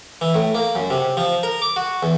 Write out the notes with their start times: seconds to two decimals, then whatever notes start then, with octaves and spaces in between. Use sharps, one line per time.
0.21 E3
0.34 A2
0.55 A#3
0.75 F#2
0.90 C3
1.17 F3
1.43 A#4
1.62 D6
1.76 F#4
2.03 E2